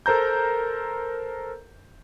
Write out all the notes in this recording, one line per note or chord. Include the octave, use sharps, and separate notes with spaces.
A4 A#4 C5 A#5 G6